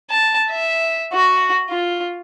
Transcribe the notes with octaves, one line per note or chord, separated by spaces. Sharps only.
A5
E5
F#4
F4